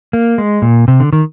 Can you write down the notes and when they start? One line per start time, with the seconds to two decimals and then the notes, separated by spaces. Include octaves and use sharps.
0.13 A#3
0.38 G#3
0.62 A#2
0.88 C3
1.00 D3
1.13 D#3